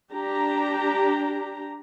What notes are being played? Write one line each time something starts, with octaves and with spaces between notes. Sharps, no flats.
D4 G4 A#5